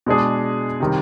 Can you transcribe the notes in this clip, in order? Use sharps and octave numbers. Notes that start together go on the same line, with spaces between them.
B2 G#3 D4 G#4
C3 D#3 G3